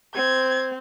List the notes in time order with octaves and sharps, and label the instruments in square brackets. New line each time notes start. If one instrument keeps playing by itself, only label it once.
[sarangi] C4 [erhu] G#6